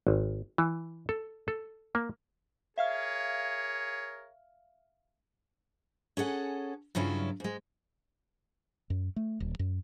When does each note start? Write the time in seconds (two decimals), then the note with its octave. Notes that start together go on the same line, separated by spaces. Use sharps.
0.07 G#1
0.58 E3
1.09 A4
1.48 A4
1.95 A#3
2.78 G#4 A#4 C#5 E5 F5 F6
6.17 C#4 G#4 A4 F#5
6.95 G2 C#3 F#3 C#4 E4 F4
7.40 G#2 G#3
8.90 F#2
9.16 A3
9.40 D#1
9.59 F#2